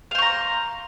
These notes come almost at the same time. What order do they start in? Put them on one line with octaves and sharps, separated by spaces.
F5 C5 C#6 A#5